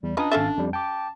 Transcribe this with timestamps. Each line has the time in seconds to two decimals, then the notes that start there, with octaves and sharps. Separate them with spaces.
0.03 E2 G3
0.17 C#4 D4 F4 B4 D#5 A#5 D#6
0.31 G#1 C#4 A4 E5 F5 A6
0.58 F2 G3
0.73 G5 A5 D6